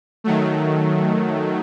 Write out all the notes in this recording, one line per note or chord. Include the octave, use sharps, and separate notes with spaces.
D#3 F#3 A3